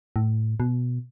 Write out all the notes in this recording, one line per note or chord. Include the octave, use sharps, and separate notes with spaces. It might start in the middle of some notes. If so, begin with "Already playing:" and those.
A2
B2